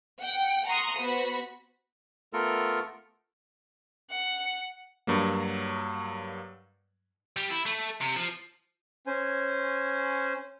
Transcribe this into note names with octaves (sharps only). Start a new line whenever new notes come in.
F#5 G5
F#5 A#5 C6 C#6 D#6
B3 F#4 C5 B5
A3 B3 F4 A4 A#4
F#5
G2 F#3 A#3
G3
E4
A3
C3
F3
C#4 C5 G#5